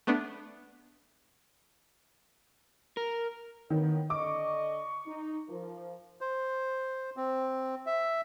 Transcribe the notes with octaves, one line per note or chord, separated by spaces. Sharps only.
A3 B3 D4
A#4
D#3 A#3 B3 C#5
D3 D#5 C#6 D6
D#4
F3 A#4
C5
C4
E5